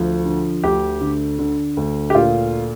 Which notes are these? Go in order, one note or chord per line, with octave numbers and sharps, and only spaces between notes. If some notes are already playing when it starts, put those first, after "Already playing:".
Already playing: D2 F3
D3
D2 G4
D3
D3
D2
G4
A#2 F4